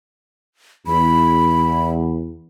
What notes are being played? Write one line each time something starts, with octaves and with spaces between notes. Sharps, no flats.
E2 B5